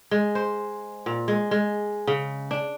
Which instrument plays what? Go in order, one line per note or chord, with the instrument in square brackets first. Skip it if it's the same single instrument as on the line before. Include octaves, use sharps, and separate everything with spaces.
[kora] G#3
C5
A#2
G#3
G#3
C#3
D4